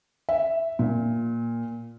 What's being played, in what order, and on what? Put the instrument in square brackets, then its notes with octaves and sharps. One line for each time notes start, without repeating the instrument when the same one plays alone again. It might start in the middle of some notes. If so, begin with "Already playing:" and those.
[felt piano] E5
A#2